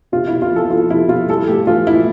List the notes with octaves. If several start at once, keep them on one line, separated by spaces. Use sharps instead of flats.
C3 F4
E4
C3
F4
F3
A4
F3 F4
C3 E4
C3 F4
G3 A4
A2 G4
E3 F4
A2 E4